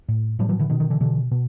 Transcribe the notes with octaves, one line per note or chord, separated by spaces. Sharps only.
A2
A2 F3 G3
E3 F#3
D3 E3
B2 D#3
D#3
D3 E3
B2 D3 E3
B2